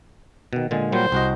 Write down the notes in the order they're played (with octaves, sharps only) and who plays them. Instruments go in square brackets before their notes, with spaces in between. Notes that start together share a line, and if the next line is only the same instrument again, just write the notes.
[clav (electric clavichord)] B2 D#3
A#2 D3 G#3
[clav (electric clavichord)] A#2 F#3 G3 [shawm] C5
[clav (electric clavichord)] C2 F#4 D#5